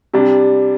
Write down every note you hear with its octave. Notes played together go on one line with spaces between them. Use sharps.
C3 G3 D4